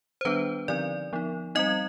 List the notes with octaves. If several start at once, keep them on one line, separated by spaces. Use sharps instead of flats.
C5
D#3 G3 B3 D4 B4
D3 F3 C4 D#4 D5
F3 B3 D#4
G3 C4 D#4 D#5